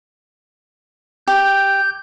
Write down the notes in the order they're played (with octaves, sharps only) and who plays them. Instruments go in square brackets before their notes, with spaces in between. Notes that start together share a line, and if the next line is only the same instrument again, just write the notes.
[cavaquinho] G4 [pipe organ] G6